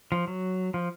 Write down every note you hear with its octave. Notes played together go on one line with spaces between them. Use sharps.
F3
F#3
F3